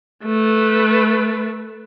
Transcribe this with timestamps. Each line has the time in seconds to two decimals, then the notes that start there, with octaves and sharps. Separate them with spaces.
0.24 A3 B4